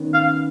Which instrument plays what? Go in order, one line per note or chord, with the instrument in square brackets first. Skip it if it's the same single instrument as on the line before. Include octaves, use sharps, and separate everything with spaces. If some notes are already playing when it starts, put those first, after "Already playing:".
Already playing: [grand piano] D#3 B3 C#4
[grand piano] C#4 [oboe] F5